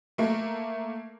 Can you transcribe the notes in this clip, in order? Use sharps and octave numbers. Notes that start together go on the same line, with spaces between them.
A3 A#3